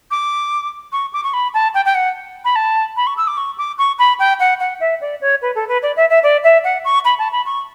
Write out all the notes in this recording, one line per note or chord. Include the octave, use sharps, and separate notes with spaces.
D6
C#6
D6
C#6
B5
A5
G5
G5
F#5
B5
A5
B5
C#6
E6
D6
C#6
D6
C#6
B5
G5
F#5
F#5
E5
D5
C#5
B4
A4
B4
D5
E5
E5
D5
E5
F#5
C#6
B5
A5
B5
C#6